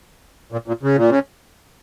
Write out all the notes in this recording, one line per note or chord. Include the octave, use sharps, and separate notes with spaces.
A#2
A#2
C#3
A#2
C#3